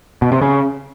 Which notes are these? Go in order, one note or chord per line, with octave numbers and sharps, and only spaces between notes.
B2
C3
C#3